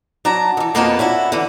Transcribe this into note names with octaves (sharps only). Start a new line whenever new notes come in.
F#3 D4 A5 A#5
D#3 E3
F2 B2 A#3 B3 F4 A5
C#4 D4 E4 F#4
D3 E3